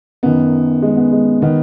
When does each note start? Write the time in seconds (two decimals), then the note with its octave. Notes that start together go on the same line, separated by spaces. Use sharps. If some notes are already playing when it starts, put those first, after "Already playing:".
0.23 F#2 D#3 B3
0.82 G#3
0.97 B3
1.12 G#3
1.42 D#3 B3